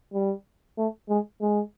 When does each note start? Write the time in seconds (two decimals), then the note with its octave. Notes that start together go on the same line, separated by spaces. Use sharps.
0.14 G3
0.78 A3
1.09 G#3
1.41 G#3